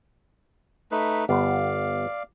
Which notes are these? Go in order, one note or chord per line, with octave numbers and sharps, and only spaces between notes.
A3 D#4 B4
G1 B3 D5 F5